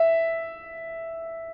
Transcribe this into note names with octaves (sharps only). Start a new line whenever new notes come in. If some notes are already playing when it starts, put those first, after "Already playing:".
Already playing: E5